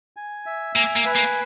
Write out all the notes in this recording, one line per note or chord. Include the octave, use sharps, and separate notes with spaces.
G#5
E5
A#3 G#5
A#3
B4
A#3